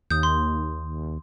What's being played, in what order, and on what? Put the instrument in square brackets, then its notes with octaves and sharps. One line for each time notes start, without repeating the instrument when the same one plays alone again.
[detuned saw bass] D#2 [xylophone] D#6 G6
[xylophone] C6